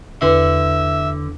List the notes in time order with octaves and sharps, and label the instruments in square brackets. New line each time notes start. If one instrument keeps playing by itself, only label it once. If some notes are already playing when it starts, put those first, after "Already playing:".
[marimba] E2 B4 C6 [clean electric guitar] D3 [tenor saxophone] E5